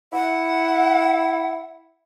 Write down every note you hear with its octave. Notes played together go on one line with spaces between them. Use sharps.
E4 F#5